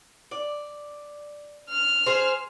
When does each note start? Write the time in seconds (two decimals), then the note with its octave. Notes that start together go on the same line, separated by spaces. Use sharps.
0.31 D5
1.70 F6
2.06 G#4 C5